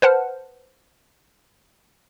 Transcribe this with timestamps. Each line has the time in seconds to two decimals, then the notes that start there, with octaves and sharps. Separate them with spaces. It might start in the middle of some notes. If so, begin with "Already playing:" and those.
0.02 B4 C5 F#5 A5 F6